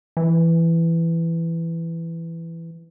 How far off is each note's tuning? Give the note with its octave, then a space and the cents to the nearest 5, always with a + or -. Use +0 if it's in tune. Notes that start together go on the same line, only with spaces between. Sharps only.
E3 +10